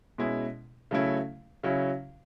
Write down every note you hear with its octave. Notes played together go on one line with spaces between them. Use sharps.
B2 G#3 C#4 E4
C#3 F#3 A3 C#4 E4
C#3 F#3 C#4 E4